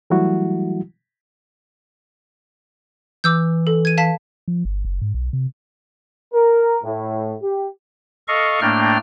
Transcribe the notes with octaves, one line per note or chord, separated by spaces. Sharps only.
E3 F#3 G3 A3 E4 F#4
E3 D6 E6 G6
A4
G#6 D#7
F5 A5 B6
F3
G1
F#1
G#2
B1
C3
A#4
A2
G4
A4 D#5 F5 C#6
A2 A3 A#3 D4 G5 F6